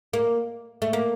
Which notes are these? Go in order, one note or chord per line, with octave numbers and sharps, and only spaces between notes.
A#3
A3
A#3